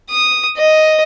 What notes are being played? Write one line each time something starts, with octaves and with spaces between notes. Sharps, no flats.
D#6
D#5